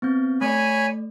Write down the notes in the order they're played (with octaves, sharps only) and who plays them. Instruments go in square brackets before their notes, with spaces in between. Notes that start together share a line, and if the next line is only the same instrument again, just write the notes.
[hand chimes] B3 C4 G6
[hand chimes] A3 D5 [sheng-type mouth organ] C#5 G#5 B5